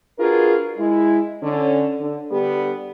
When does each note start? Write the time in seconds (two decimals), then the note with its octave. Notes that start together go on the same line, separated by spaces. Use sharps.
0.19 D4 F4 F#4 G#4 A#4 B4
0.78 G#3 E4
1.42 D3 C#4
2.00 D3
2.31 D3 G3 B3 G4